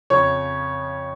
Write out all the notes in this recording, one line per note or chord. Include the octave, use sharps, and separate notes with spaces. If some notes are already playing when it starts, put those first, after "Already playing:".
F2 C#3 F3 C#5